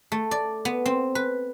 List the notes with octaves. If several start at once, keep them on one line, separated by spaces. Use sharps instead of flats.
A3
D5
B3
C4
B4